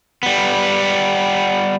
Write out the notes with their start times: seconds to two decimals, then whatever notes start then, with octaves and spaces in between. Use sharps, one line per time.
0.23 G3 B3